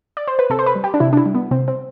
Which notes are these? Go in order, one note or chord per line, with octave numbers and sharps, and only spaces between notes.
D5
C5
B4
C3 A4
C5
B4
G3
G4
D4
C3 E4
D4
E4
G3
B3
C3 C4
C4